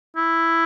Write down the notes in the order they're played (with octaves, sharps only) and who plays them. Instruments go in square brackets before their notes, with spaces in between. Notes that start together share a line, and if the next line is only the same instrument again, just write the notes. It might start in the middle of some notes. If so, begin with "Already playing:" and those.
[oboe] E4